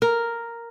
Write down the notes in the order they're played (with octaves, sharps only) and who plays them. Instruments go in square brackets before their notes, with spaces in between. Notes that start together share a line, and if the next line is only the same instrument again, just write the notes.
[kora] A#4